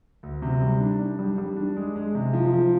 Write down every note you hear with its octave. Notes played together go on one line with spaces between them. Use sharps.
D2
C3
G3
D4
D4
G3
G3
D4
G#3
G#3
C3
F3
F3